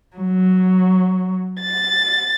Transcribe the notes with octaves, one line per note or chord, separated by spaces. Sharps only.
F#3
A6